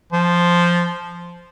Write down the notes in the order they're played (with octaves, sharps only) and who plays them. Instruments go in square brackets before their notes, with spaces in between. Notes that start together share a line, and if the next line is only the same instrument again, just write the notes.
[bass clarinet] F3